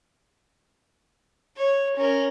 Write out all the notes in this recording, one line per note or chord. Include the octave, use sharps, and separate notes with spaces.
C#5
C#4 A#4